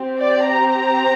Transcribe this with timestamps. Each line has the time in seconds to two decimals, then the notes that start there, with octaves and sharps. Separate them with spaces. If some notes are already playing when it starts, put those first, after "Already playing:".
Already playing: C4 G4
0.19 D5
0.50 A#5